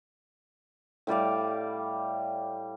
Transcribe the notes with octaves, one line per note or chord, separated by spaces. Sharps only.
A2 G3 D5 F5